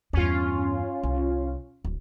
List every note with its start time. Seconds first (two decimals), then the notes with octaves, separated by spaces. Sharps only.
0.13 E2 G2 C#4 F4
1.03 C2
1.85 D1